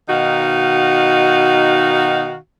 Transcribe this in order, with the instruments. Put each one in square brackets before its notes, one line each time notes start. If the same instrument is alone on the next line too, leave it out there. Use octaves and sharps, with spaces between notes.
[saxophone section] B2 D#3 D#4 F#4 F5